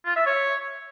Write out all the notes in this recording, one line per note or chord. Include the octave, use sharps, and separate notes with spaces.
F4
E5
C#5